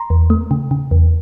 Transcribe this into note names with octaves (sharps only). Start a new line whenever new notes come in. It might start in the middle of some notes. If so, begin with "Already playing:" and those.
Already playing: A#5 C6
E2
A3
C#3
C#3
E2